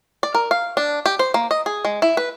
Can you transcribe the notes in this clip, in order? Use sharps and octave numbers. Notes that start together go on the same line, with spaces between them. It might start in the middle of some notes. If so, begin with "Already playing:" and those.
D5
A#4
F5
D4
G4
C5
A#3
D#5
G#4
G#3
E4
B4